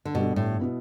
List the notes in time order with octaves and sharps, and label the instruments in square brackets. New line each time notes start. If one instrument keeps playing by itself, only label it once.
[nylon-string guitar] D3
[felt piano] G1 G2 G3 D4 A4 [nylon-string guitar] B2
[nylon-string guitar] A2
[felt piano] B2 B3 E4